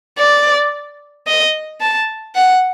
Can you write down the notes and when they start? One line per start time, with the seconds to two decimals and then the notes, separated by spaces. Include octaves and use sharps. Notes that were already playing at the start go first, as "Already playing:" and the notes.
0.19 D5
1.27 D#5
1.81 A5
2.35 F#5